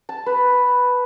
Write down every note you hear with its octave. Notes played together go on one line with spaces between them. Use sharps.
A5
B4